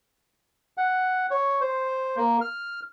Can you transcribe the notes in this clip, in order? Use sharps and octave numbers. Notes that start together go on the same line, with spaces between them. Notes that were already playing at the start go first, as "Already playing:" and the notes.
F#5
C#5
C5
A#3
F6